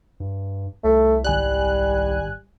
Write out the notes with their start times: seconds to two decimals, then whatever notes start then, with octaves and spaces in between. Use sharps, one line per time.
0.20 G2
0.84 C2 A3
1.24 G#1 G3 G#5 F#6